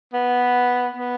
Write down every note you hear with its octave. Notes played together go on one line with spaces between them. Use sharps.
B3
B3